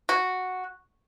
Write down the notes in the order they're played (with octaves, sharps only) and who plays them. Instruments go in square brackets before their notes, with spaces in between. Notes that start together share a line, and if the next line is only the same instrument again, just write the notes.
[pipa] F#4